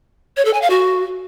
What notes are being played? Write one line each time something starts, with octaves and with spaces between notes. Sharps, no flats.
C#5
A4
G#5
F5
F#4